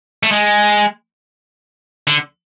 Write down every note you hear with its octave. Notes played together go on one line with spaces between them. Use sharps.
A3
G#3
D3